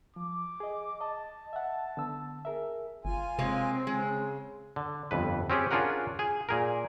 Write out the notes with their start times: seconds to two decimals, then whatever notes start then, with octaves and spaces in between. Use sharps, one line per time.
0.16 F3 D6
0.60 G#4 D#5
1.01 D#5 A5
1.53 E5 F#5
1.97 D3 B3 E6
2.45 G#4 A#4 E5
3.05 G1 F4 G#5
3.39 C3 G#3 A#3 C4 C#5
3.87 C#3 G#3
4.76 D3
5.11 G1 F2 B4
5.50 C4 C#4 G4 G#4
5.71 C#4 D4 F4 G#4 A#4 F#5
6.19 G#4
6.49 A#2 G#4 A#4